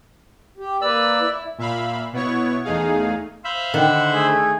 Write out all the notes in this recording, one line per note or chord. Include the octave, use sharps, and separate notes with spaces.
G4
A#3 B4 D5 E6
E4
A#2 E5 F5 B5
B2 B3 E4 C#5 C#6
E2 A3 D#4 G#4 F5
C5 E5 F5 B5
D3 D#3 F#5
A3 G#4